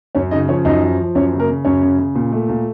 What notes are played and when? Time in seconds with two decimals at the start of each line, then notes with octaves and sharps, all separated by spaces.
0.15 F#2 C#4 C#5
0.31 C#3 D#4 D#5
0.48 F3 C#4 C#5
0.65 F#2 D#4 D#5
0.82 F3
0.99 F3
1.15 F#2 C#4 C#5
1.32 C#3
1.40 A#3 A#4
1.49 C#3
1.65 F#2 C#4 C#5
1.82 C#3
1.98 C#3
2.15 A#2
2.32 A3
2.49 A#2